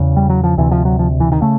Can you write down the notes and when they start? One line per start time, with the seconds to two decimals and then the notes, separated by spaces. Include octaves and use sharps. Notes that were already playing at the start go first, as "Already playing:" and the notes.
Already playing: E2 C#3
0.17 G3
0.30 F#3
0.44 F3
0.57 D2 C3 E3
0.71 F3
0.85 F#3
0.99 F3
1.20 E3
1.32 D#3
1.41 C#3 A3